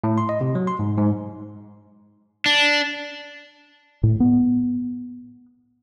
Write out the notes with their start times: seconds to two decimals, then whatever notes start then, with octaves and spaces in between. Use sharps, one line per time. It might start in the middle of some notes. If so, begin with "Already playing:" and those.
0.04 A2
0.18 C6
0.29 D#5
0.41 C3
0.55 F#3
0.67 C6
0.79 G#2
0.98 G#2
2.46 D4
4.03 A2
4.20 B3